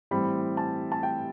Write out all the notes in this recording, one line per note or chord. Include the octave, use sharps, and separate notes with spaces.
A2 E3 G3 C4 B5
A5
A5
G5